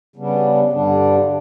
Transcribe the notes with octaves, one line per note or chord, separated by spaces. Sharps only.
C#3 G3 B3 D4
G2 D3 G3 D4